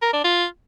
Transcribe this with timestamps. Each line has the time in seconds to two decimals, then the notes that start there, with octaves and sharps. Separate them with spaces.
0.02 A#4
0.13 D4
0.24 F4